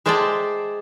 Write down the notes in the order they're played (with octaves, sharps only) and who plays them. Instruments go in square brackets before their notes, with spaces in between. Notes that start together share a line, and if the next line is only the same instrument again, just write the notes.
[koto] G#3 C5 D5 E5 G5 A5